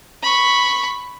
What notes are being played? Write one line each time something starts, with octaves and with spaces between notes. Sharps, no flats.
B5 C#6